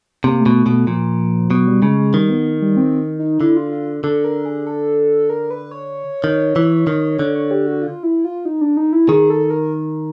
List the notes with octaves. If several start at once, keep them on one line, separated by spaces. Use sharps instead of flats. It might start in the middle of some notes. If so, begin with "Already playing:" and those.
C3 A#3
A3
B2
A3
B2
A3
A#2 F3
B2 F#3
G3
C#3 G#3
G#3
D#3 G3
B3
G3
C4
D#4
D3 E4
F4
F4
D3 A4
A#4
G#4
A4
A#4
B4
C#5
D#3
E3
D#3
D3
C#5
G4
F#4
F4
E4
F4
D#4
D4
D#4
E4
D#3 G#4
A4
A#4